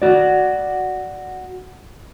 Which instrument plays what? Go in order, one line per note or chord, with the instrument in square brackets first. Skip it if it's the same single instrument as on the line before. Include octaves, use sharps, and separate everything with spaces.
[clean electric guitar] F#4 D5